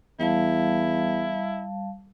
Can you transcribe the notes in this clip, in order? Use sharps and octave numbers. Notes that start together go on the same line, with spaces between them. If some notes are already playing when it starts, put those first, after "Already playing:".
E2 G3 E4 F5 A5